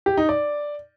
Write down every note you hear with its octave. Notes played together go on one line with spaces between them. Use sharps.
G4
D#4
D5